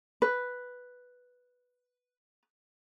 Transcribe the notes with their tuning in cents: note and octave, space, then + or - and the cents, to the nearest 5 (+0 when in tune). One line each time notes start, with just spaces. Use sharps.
B4 +0